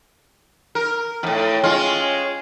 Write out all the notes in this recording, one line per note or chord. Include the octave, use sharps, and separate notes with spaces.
A#4
F2 A2
G#3 C#4 F4